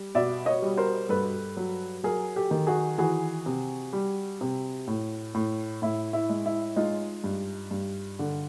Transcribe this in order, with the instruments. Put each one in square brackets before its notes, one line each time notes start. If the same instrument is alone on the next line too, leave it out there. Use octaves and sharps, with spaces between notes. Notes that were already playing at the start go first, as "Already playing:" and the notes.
Already playing: [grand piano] G3
B2 D5 E5
C#5 D#5
G3
A#4 C5
G2 A4 B4
F#3
F#3 G#4 A#4
G4 A4
D#3
F#4 G#4
E3 F#4 G#4
C3
G3
C3
A2
A2
A2 E4
E4
G#3
E4
G#3 D#4 F4
G2
G2
D3